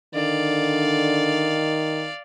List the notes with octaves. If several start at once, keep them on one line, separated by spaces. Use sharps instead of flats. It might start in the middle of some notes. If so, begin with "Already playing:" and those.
D3 D#3 D5 F5